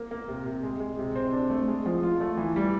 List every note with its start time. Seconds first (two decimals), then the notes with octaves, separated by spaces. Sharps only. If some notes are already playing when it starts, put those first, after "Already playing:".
Already playing: A#3
0.11 A#3
0.28 C3
0.46 C3
0.63 G#3
0.80 G#3
0.99 C3
1.16 C4
1.33 D4
1.50 A3
1.68 G#3
1.86 F3
2.03 F4
2.20 A3
2.37 E3
2.56 G3